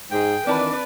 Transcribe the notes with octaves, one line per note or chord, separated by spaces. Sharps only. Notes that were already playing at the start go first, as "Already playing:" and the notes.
G#2 G#4 G5
D#3 E3 C4 D4 B4 D5 A5 B5